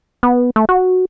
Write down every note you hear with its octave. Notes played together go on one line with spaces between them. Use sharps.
B3
A3
F#4